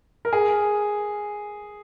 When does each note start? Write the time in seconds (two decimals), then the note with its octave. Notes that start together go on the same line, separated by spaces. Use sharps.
0.25 A#4
0.33 G#4